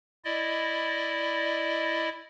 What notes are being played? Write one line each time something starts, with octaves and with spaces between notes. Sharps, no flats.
E4 D5 D#5